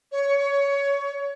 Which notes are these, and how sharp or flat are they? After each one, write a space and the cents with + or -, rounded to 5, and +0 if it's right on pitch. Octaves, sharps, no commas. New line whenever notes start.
C#5 +20